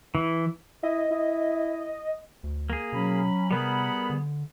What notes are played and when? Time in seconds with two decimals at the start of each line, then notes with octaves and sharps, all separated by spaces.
0.15 E3
0.83 E4 D#5
1.11 E4
2.43 D2
2.70 A#3 G#4
2.93 B2 F#3 C#4 B5
3.51 C3 G3 B3 G#4 A#4 F#5 B5
4.10 D3